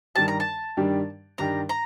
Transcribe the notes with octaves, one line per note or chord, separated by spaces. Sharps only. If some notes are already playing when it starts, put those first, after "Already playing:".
G2 D#3 G3 D4 G4 A5
A#5
A5
G2 D#3 G3 D4 G4
G2 D#3 G3 D4 G4 A#5
A#5